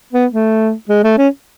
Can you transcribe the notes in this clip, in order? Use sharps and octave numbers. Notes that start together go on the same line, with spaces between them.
B3
A3
G#3
A3
C#4